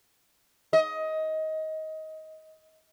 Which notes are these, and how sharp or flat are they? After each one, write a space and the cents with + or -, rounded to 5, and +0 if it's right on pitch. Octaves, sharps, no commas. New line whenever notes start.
D#5 +20